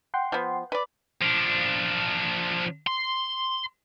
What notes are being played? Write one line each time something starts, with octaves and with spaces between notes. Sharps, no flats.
F#5 G5 C6
F3 B3
B4 D5
F3 D4
C6